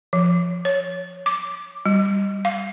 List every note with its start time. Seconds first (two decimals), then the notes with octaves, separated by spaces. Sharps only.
0.13 F3
0.65 C#5
1.26 D6
1.85 G3
2.45 F5